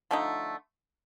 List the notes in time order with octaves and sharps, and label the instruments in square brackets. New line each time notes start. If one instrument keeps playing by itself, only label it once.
[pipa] D3 F3 A3 D#4